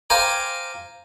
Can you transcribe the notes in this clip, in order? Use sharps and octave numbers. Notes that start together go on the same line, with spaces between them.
C5 F5 G5 G#5 A#5 D6